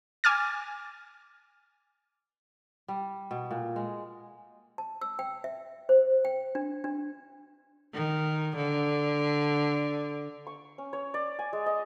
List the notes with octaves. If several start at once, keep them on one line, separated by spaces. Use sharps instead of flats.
G#5 D6 F6 A6
G3
B2
A#2
G#3
A5
E6
G5
E5
C5
G5
D4
D4
D#3
D3
C#6
C#4
C#5
D5
G#5
G#3
D#5